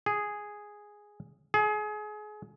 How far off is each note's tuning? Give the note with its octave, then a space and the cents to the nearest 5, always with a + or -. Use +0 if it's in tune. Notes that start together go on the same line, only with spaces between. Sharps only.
G#4 +0
G#4 +30